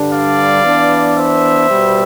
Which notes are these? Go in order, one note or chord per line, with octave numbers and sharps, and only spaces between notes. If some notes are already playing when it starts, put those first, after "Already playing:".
Already playing: G2 D3 G3 D4
D5 F5
E3 B3 D4
C5 E5
B2 G3 B3